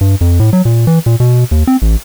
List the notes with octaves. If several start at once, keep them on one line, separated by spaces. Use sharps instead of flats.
G2
F2
A2
F#3
A#2
E3
A#2
B2
D#2
C4
A1